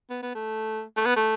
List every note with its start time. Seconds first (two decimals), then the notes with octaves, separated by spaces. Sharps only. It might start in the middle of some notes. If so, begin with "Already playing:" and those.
0.10 B3
0.22 B3
0.35 A3
0.96 A3
1.06 B3
1.16 A3